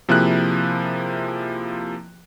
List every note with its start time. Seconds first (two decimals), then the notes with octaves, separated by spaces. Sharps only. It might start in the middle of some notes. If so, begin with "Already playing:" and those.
0.09 C3 F3 A#3 E4 G#4 F#6